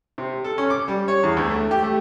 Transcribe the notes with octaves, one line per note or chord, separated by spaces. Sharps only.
C3
A4
C#4
D6
G3
C#5
E2
D2
A3
G4
A3